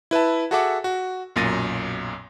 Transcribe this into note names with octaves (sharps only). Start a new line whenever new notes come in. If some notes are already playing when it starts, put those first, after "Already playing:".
E4 B4 E5 A5
F#4 G#4 A4 E5 F#5 D6
F#4
B1 F#2 A#2 A6 A#6 D#7